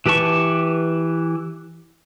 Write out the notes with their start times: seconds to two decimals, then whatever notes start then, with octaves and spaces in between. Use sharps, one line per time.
0.06 E3 G4 B4 A5 C#6